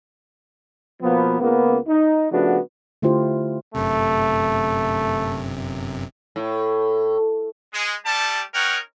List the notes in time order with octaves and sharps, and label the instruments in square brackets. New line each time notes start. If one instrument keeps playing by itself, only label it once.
[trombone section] B2 F3 A#3 B3
C#2 A#3 B3
D#4
C#3 F3 A3 B3 D4 F#4
[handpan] D3 A3 E4 F4 G4 C5
[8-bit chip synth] G1 F#2 C3 [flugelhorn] A3
[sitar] A2
[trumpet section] G#3
G3 A3 G4 D5 A5
C#4 D#4 A#4 C#5 F#5 G5